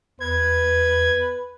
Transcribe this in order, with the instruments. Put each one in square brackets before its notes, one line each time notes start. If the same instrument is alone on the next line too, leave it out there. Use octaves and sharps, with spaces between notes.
[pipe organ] E2 [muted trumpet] B4 [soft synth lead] G#6